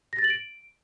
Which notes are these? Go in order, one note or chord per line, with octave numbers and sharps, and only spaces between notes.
A#6
A6
F#7
D7